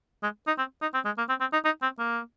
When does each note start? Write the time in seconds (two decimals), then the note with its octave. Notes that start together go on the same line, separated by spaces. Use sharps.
0.23 G#3
0.47 D#4
0.59 C4
0.82 D#4
0.94 C4
1.05 G#3
1.18 A#3
1.29 C4
1.41 C4
1.53 D#4
1.65 D#4
1.82 C4
1.99 A#3